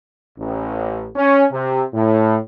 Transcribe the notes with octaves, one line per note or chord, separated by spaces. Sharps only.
A1
C#4
C3
A2